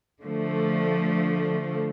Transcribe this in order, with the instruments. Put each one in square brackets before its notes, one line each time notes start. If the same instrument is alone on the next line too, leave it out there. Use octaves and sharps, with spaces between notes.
[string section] D3 F3 A3